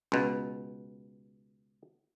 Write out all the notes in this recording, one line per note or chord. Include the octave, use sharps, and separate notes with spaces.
C#2 B2